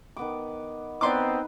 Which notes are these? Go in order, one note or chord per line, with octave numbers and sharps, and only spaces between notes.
D#3 B3 D6
B3 C4 D#4 B4 D5 C6 D6